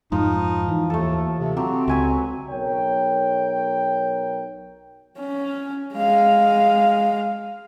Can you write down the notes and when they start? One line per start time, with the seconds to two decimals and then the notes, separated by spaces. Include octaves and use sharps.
0.12 F2 G#2 F3 D#4
0.68 E3
0.90 D#2 A3 A4
1.38 C3
1.57 F#3 C4 G4
1.88 C#2 E5 G#5 C#6
2.49 B1 A#4 C#5 G5
5.18 C#4
5.95 G#3 F5